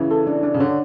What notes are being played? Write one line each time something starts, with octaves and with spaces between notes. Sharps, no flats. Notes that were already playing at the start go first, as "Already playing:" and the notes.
Already playing: C#3 E3
A4
D4
D4
C#3
D3 C#5